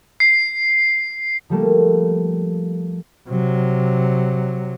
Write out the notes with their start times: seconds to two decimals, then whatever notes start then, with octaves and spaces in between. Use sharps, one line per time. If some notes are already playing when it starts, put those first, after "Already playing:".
0.20 C7
1.50 F3 G3 A3 A#3
3.29 C3 F#3